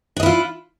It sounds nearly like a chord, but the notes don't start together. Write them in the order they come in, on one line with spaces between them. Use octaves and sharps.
D4 D#5 E4 F4